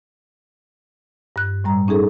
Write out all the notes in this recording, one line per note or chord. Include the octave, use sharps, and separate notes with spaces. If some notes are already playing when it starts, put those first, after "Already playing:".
G2 F#6
A2 G3 A#5
C#4 D#4 G#4 A4